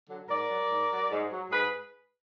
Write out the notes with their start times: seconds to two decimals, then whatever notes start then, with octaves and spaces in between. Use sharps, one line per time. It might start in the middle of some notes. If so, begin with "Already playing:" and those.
0.09 D3 F#3
0.29 G#2 A#4 D5
0.50 F#3
0.70 G#2
0.91 F#3
1.10 G#2
1.31 F#3
1.51 G#2 G#4 B4